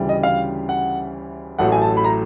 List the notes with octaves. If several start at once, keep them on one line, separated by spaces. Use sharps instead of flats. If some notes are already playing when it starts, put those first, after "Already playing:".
Already playing: D2 C#3 E3 G3
D#5
F5
F#5
A1 A2 F#3 A3 F#5
G#5
A5
B5
A#5